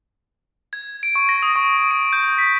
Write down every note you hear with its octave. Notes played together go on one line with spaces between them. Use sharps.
G#6
D7
C#6
A#6
D#6
C#6
D7
G6
B6